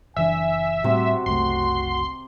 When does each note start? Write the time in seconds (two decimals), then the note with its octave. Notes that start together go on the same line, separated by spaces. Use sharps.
0.16 F#1 E3 D4 E5 G#5
0.84 A2 C3 G3 C4 F#4
1.26 F#1 C2 A3 C6